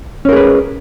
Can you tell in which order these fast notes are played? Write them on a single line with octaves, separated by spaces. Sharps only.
C#4 A#4 G#4 B4